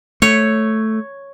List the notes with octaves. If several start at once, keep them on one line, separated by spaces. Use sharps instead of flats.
A3 C#5